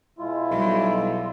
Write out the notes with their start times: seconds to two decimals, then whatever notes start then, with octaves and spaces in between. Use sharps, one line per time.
0.19 B2 G#3 E4 F4
0.51 B1 F#3 G3